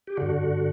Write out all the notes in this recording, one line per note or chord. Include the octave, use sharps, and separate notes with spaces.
G4
G2 D3 F#4